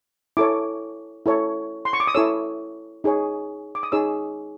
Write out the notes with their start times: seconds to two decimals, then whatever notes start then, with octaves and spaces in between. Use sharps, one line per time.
0.37 E4 A4 C#5 D6
1.26 E4 A4 C#5
1.85 C6
1.93 C#6
2.00 D6
2.07 D#6
2.15 E4 A4 C#5 E6
3.04 D#4 G#4 C#5
3.75 D6
3.83 D#6
3.92 D#4 G#4 C#5 E6